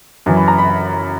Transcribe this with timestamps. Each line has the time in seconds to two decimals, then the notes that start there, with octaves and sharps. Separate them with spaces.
0.26 F#2 E3
0.37 B5
0.48 A#5
0.58 B5